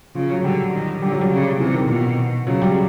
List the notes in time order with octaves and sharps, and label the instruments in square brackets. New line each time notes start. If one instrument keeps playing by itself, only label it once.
[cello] C#3 [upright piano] F3
[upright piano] F#3
[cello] D3 [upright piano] G3
[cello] D#3
[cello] D3 [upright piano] G3
[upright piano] F#3
G3
[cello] C#3
[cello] C3 [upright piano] E3
[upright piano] D#3
[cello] B2 [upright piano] F3
[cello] C#3 [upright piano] F#3
[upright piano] G3